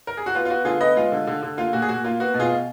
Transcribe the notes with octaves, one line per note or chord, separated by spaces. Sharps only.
A#4
G#4
F#4
B3 F4
F4
B3 F#4
D3 F4 G#4
B3 B4 D#5
G#3 F4
D3
D3
D3
A#3 F4
A#2 F#4
G#4
A#2 F#4
A#3 F4
B3 F#4
B2
F4 G#4
B2